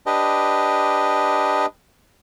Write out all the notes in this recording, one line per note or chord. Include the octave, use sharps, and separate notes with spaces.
D4 G4 B4 D#5